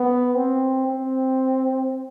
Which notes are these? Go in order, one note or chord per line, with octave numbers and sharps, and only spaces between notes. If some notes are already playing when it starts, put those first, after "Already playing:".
Already playing: B3
C4
C4